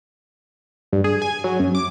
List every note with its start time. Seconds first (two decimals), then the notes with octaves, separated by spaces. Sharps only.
0.93 G2
1.04 G#4
1.22 G#5
1.44 F#3
1.60 F#2
1.75 D6